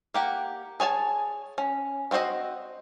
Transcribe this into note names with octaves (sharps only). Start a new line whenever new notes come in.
A#3 G4 F#5
G#4 C#5 G#5 A5
C#4
B3 C4 F#4 C5 D#5